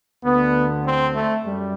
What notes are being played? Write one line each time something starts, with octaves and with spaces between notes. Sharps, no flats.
D2 D3 B3
C4
A3
F#2 G3